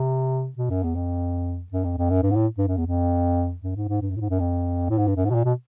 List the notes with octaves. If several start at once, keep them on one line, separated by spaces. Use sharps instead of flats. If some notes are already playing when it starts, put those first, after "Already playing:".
Already playing: C3
B2
F#2
E2
F2
F#2
F2
F2
F#2
G2
G#2
A2
G2
F#2
E2
F2
F#2
G#2
G#2
G2
F#2
A2
G#2
F#2
F2
A2
G#2
G2
F#2
G#2
B2
A#2
B2